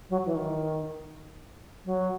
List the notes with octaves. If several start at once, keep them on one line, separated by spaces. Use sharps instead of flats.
F#3
E3
D#3
F#3